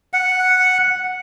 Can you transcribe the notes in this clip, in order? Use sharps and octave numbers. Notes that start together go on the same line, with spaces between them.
F#5